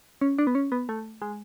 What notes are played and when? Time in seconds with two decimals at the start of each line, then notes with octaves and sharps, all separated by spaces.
0.21 C#4
0.38 D4
0.47 B3
0.55 C#4
0.72 B3
0.89 A3
1.22 G#3